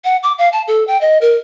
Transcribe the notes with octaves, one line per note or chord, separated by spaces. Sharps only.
F#5
D6
F5
A5
A4
G5
D#5
A#4